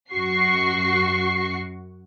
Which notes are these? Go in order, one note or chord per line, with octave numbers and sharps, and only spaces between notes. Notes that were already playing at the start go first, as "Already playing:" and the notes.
F#2 F#4 C#6 C7